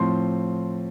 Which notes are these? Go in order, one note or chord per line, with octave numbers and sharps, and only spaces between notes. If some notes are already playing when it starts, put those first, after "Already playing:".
Already playing: A2 F3 C4 C6